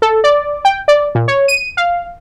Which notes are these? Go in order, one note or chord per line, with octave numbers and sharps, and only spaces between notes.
A4
D5
G5
D5
A#2
C#5
D#7
F5